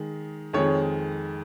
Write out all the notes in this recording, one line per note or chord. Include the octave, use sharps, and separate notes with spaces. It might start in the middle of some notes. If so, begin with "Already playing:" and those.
Already playing: D#3 G#3
F2 D#3 G#3 C#5